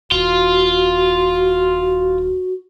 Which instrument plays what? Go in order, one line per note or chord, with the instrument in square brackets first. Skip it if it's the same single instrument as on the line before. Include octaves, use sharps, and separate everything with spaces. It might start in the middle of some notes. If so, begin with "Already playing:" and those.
[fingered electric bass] D#1 [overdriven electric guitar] F4 [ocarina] F#4